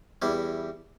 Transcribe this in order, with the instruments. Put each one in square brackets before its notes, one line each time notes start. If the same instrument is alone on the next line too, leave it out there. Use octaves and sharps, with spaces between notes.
[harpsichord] E2 G3 E4